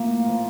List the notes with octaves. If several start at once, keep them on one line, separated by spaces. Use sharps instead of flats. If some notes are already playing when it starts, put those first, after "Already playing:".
Already playing: A2 F3 A#3
A#2 F3